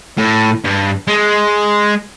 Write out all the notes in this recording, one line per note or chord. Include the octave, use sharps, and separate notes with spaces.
A2
G2
G#3